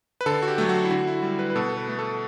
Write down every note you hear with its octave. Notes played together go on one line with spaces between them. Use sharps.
B4
D3 A4
F#4
G4
F#3 A3
F#4
E4
D3 F#4
E4
G3
B4
B4
B2 A4
A4
B4
A3
A4